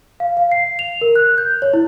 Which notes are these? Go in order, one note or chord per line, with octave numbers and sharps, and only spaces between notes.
F5
F5
C7
F7
A#4
F#6
G6
C#5
E4